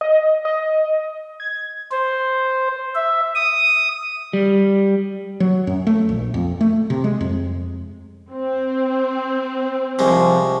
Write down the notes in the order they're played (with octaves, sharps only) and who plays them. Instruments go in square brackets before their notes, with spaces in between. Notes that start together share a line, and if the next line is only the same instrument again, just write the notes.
[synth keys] D#5
D#5
G#6
[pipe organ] C5
E5
D#6
[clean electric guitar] G3
[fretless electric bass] F#3
F#2
A3
A#1
F2
A3
C3
G#3
F2
[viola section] C4
[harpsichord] C2 G#3 [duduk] F3